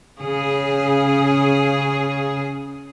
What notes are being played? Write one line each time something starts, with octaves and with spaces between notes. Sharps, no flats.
C#3 G#4